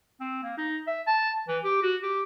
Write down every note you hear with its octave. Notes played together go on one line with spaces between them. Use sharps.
C4
A#3
D#4
E5
A5
E3
G4
F#4
G4